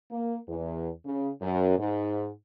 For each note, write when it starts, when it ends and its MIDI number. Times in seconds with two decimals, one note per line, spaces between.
0.11 0.36 58
0.48 0.88 40
1.05 1.30 49
1.42 1.76 42
1.79 2.28 44